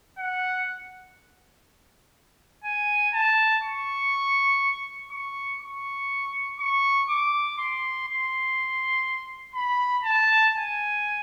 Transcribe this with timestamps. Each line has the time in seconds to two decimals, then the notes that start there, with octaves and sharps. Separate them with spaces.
0.18 F#5
2.64 G#5
3.14 A5
3.64 C#6
5.11 C#6
5.61 C#6
6.60 C#6
7.09 D6
7.58 C6
8.07 C6
9.55 B5
10.04 A5
10.54 G#5